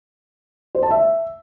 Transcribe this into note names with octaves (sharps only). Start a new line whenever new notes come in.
C5
A5
E5